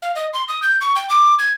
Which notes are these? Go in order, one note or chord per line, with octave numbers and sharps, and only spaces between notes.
F5
D#5
C6
D#6
G6
C#6
G5
D6
G#6